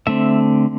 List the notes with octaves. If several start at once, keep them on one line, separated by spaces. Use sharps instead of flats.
D3 A3 C4 E5